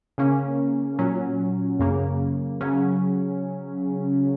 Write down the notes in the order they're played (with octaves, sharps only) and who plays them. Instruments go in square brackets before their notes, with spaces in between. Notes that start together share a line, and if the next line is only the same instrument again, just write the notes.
[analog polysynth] C#3 A#3 C#4
A#2 F#3 C#4
F#2 C#3 A#3
C#3 F#3 C#4